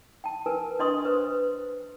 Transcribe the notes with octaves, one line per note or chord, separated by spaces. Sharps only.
G5 A5
A#4 B4 G#5
D4 B4 D#5 C6 C#6 D#6
B4 C5